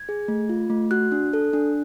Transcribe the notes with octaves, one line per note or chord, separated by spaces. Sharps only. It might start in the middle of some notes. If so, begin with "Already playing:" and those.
Already playing: G#6
G#4
A3
F4
A3
F#4 F#6
D4
A4
D4